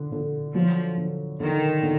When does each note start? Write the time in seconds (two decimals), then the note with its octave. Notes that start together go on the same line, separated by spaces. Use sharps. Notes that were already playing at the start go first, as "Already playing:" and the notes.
Already playing: D3
0.12 D3
0.55 F3 F#3
0.97 D3
1.40 D3 D#3
1.83 D3